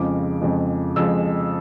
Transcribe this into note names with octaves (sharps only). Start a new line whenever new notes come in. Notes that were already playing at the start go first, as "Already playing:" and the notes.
Already playing: F2 C#3 F3 G#3 D6
F2 C#3 F3 G#3
F2 C#3 F3 G#3 E6